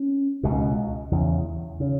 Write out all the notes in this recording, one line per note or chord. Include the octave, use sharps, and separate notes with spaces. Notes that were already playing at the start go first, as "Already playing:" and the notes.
Already playing: C#4
C#2 B2
E2 C#3
C#3